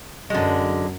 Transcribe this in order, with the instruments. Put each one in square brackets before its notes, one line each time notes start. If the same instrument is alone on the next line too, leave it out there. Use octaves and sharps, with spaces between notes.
[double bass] F#2 [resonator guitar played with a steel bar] D3 G#3 [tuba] F#3